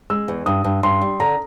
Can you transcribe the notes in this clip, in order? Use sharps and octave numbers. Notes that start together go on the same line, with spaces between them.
G#3 E6
E2
G2 D#6
G2
G2 C6
G3
D3 A#5